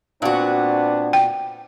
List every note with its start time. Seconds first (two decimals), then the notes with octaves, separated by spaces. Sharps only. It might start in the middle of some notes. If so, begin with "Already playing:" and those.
0.22 A#2 B3 C4 D4 F#4
1.13 G5